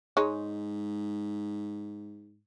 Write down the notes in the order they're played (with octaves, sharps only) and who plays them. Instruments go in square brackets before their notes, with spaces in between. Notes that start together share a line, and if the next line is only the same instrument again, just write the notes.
[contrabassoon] G#2 [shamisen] G#3 D#4 C#5